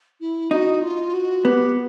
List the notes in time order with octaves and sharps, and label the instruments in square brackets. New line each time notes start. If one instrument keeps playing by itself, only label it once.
[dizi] E4
[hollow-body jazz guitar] D#4 [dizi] F#4
[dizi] F4
F#4
[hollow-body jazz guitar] B3 [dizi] G4